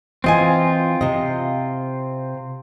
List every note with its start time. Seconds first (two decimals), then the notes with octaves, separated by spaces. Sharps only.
0.24 E3 C4 F4 D#5 G#5
1.01 C3 D#5